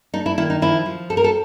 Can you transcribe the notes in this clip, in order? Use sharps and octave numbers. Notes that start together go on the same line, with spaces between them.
D4 D#4
E4
D#3 E4
D#4
F3 E4
F3
C4 A4
A#4
A4